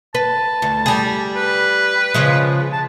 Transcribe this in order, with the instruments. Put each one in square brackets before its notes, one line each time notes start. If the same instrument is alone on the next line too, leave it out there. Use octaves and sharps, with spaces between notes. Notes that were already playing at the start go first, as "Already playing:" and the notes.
[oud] B4 [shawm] A5
[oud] D2
G3 G#4
[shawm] B4
[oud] C#3 F3 G#3
[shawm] A5